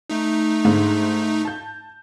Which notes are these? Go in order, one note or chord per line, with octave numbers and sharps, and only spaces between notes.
A3 D#4
G#2 D3 G#3
A5 G6